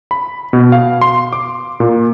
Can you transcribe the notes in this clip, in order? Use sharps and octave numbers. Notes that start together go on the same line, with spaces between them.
B5
B2
F5
C6
D6
A#2